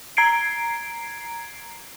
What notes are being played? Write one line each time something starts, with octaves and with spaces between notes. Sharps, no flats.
A#5 G#6 C7 D7